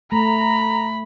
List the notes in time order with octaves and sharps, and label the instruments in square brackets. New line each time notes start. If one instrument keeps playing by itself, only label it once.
[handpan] A3 [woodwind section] A#5 [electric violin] B5